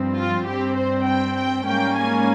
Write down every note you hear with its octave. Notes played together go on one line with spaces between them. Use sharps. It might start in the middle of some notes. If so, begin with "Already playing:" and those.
Already playing: G2 F3 C4
F4
G2 G3 C4 G4
C5
G5
G5
G#2 G3 A#3 C#4 G5
G#5